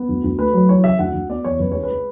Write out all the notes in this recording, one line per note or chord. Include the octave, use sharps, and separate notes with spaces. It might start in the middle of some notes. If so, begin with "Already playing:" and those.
Already playing: B3
D2
D2
A3 B4
F#3
E3 C#5
C#3 E5
D2 F#5
D2
B3 D5
E2 C#5
C#2 B4
G#3 C#5
B4
G#3